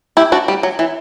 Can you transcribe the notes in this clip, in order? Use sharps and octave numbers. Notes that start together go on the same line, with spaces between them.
E4 G4
D4 F#4
G3
F#3
E3